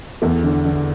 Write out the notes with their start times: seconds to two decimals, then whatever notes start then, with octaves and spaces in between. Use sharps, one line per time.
0.22 E2 A4
0.43 D3
0.65 D3